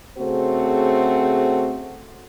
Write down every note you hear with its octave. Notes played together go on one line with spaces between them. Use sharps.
C#3 A3 C4 F#4 G#4 C5